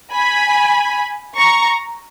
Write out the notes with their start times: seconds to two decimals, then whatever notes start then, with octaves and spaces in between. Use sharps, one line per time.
0.12 G#5 B5
1.36 A#5 C#6